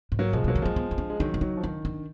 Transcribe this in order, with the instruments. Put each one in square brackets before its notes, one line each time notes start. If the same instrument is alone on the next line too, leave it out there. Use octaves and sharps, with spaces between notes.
[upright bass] G#2
[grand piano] F#3 A#3
[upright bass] B2 [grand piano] F3 G#3
[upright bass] B2 [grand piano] F#3 A#3
[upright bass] D3
[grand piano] F3 G#3 [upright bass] A#3
[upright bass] B3
B3
D4
[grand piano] G#3
[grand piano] D#3 F#3 [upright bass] D4
[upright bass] D4
[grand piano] D#3 F#3 [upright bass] D#4
[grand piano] F3
[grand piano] D#3 [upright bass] D4
[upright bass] D4